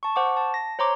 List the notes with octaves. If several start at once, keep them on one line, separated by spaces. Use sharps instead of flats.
A5 C#6
C5 F#5 C#6 D6
A5
A#6
C5 C#5 A#5 C6 D6